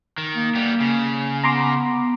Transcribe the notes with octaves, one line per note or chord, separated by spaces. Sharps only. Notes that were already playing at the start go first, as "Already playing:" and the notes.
D#3
A#3
G3 B3
C#3
B3 A#5 C6 D6